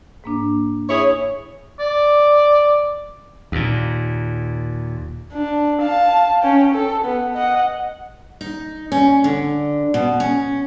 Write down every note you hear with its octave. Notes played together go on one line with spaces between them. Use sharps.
G#2 A#3 D4
E4 G#4 C#5
D5
D#2 A#2
D4
F5 A5
C#4 G5
A4
B3
D#5 F#5
D#4
C#4
D3
B2
C#4